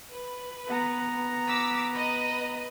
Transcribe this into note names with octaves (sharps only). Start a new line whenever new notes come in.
B4
B3 A#5
D6 E6 B6
B4 D#5 B5